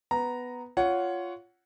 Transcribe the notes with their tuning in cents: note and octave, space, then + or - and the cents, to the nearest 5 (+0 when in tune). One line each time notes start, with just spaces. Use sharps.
B3 +5 A#5 +0
F4 +0 C#5 +15 F#5 +0